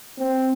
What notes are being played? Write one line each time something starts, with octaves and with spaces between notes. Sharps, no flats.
C4